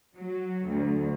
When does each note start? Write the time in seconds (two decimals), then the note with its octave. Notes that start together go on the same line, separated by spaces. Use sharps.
0.17 F#3
0.67 D2